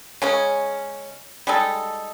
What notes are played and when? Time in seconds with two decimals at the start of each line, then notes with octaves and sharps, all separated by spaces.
0.22 C#3 G#3 C#4
1.47 G3 G#3 D#4 A4